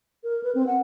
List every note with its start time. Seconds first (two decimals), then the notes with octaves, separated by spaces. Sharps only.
0.24 A#4
0.43 B4
0.55 C4
0.67 F#5